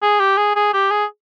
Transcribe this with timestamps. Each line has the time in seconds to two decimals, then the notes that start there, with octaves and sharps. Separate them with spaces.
0.02 G#4
0.20 G4
0.37 G#4
0.55 G#4
0.73 G4
0.91 G#4